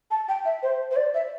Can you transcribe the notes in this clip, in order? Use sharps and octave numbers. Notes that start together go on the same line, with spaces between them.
A5
G5
E5
C5
C5
D5
E5